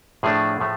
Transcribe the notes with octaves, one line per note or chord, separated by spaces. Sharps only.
A2 F3 A3 D4 G#4
A2 F3 A3